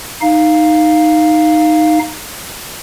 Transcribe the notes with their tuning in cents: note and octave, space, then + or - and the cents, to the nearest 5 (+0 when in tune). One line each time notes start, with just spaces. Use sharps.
D#4 +0 F5 +0